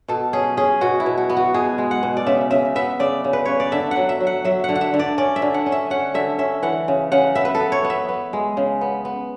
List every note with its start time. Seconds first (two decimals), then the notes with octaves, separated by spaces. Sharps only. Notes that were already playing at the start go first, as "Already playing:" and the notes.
0.08 B2 A4
0.33 C#4 G#4
0.57 C#4 G#4
0.81 B2 F#4
1.00 E4
1.06 B2
1.17 F#4
1.30 B3
1.37 F#4
1.54 B2 G#4
1.78 G#3
1.91 F#5
2.03 B2
2.17 D5
2.26 C#3 E5
2.51 C#3 E5
2.76 B3 E5
3.00 C#3 D5
3.24 C#3
3.33 B4
3.45 C#3 C#5
3.60 D5
3.72 D3 E5
3.91 F#3 F#5
4.09 E5
4.20 F#3
4.27 F#5
4.44 F#3 E5
4.64 D3 F#5
4.76 F#5
4.81 E5
4.94 D3
4.99 D5
5.18 C#4 D5
5.36 E5
5.42 D3
5.54 F#5
5.66 C#4
5.72 E5
5.90 C#4 F#5
6.14 D3 E5
6.39 C#4 E5
6.62 E3 F#5
6.88 C#3
7.12 C#3 F#5
7.35 B3 E5
7.45 B4
7.55 A4
7.60 B3
7.72 C#5
7.84 B3
7.90 E5
8.09 B3
8.33 G#3
8.57 C#3
8.81 B3
9.05 B3